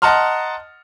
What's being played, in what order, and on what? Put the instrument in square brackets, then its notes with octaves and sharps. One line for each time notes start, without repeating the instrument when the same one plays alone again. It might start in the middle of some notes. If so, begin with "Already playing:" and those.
[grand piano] D#5 F#5 A5 A#5 C6 F6